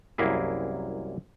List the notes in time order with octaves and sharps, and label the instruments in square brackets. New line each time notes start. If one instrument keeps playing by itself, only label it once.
[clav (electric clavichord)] C2 F#2 A#3 E4 G#4